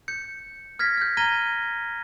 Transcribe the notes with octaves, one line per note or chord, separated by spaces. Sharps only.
G6 C#7
F6 G#6 A#6 B6
F6 G6
A#5 F6 G#6 A#6 D#7 G7